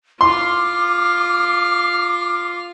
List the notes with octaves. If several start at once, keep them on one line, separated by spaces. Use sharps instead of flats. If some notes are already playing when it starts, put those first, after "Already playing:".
F4 F5 C6 D6